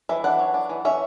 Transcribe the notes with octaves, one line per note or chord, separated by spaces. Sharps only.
E3 E5
D4 F#5
F#3
D4
E3
C#4 E5